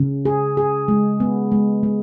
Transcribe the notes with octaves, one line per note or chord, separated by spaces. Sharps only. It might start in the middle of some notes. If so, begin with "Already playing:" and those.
Already playing: C#3
G#4
G#4
G#3
B3
G#3
G#3